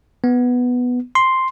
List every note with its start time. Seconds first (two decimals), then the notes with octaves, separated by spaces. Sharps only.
0.24 B3
1.15 C6